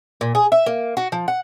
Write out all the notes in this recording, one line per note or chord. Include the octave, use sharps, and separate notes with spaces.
A#2
G#4
E5
A#3
F#4
F3
F#5